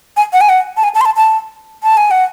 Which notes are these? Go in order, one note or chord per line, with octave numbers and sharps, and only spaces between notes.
G#5
F#5
G#5
F#5
A5
G#5
A5
C6
A5
A5
A5
G#5
F#5